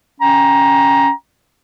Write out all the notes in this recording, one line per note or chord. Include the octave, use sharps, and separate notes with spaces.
C#4 G5 A#5